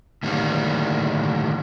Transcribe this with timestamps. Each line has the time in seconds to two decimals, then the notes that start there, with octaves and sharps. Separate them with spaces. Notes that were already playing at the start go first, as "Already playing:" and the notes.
0.23 A2 D3 D#3 G3 A#3